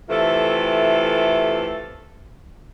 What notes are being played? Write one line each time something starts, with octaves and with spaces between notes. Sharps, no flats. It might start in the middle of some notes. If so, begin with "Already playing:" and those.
C3 E3 A3 F4 A4